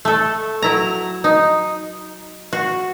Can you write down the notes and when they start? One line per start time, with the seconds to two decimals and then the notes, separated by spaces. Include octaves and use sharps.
0.05 A3 A4
0.62 F#3 E4 A#5
1.24 D#4
2.53 F#4